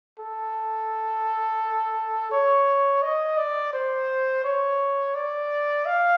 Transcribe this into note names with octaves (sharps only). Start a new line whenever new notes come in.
A4
C#5
D#5
D5
C5
C#5
D5
F5